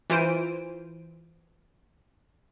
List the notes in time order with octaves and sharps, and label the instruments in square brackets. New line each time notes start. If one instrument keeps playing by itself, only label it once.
[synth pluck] E3 F4 C5 D7 D#7